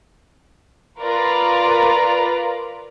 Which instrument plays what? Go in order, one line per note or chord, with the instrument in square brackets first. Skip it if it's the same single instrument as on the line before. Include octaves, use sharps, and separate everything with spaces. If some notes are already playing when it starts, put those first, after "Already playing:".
[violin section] F4 A#4 B4 D5 A#5